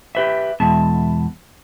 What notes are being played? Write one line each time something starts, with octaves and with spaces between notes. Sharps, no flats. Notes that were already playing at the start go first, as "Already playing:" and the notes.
G4 B4 E5
E2 B2 G#3 E5 A5